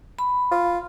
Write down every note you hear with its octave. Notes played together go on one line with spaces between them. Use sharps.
B5
F4